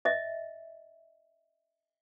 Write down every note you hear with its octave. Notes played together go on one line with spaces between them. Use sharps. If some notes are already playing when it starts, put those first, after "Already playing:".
D#5 E5